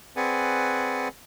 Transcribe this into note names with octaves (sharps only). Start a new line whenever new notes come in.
C4 G#4 B4 D5 F#5 G#5